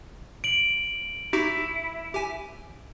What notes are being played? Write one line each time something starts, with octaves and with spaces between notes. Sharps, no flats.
D7 F#7
D#4 E4 F#4 G4
G4 G#5